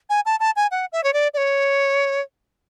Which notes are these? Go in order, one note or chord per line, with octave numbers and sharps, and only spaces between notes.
G#5
A5
A5
G#5
F#5
E5
C#5
D5
D5
C#5